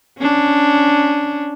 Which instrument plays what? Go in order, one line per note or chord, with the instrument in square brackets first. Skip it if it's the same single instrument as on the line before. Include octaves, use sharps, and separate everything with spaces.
[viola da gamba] C#4 D4